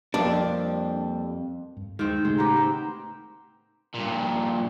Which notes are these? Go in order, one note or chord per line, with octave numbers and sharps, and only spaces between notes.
F2 G3 A#3 C4 D4
G2
D#2 D#3 G#3 C4
A2 C#3 G#3 A3
B3 G4 A#5
C4
G2 A#2